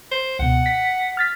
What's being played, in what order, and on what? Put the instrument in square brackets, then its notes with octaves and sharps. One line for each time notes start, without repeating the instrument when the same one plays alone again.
[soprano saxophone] C5
[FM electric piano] C#2 B2 [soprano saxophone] F#5
[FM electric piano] B6
F6 A6 B6